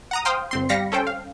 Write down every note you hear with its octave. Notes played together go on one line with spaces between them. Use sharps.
F#5 A#5 D#6
C5 F5 G5 C6 D#6 F6
G1 C4 C6
G3 F5 A#6 B6 C#7
C#4 A4 C5 G5
F5